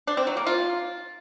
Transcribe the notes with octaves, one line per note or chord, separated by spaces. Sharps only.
D4
C4
F#3
A#3
F4